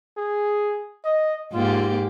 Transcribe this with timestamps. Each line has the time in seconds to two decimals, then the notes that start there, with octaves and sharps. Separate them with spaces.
0.17 G#4
1.05 D#5
1.54 G#2 A#3 F4 G4